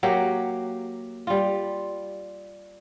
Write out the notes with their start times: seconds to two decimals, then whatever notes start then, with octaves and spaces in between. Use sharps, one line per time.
0.03 F#3 A#3 G4
1.27 G3 F4